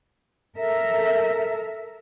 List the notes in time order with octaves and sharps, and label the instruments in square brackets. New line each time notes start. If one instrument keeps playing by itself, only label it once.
[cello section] A4 A#4 E5